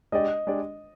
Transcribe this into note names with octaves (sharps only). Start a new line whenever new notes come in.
G#3 D4 G4 D5 D#5
G#3 D4 G4 D5